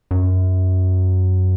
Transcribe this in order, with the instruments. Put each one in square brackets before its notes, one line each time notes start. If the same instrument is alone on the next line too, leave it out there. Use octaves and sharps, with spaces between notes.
[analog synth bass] F#2